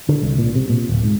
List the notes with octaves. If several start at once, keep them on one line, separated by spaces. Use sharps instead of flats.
D3
C2
A#2
C3
A#2
D1
G#2